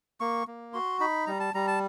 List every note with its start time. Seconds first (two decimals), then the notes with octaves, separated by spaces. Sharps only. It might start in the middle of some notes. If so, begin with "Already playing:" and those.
0.20 A#3 C#6
0.47 A#3
0.73 F#4 C6
1.00 D#4 B5
1.27 G3 A#5
1.40 A5
1.54 G3 A#5
1.67 A5